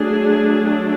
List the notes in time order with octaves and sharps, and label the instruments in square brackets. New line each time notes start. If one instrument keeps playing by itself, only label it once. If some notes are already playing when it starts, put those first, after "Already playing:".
Already playing: [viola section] F#3 A3 D4 G#4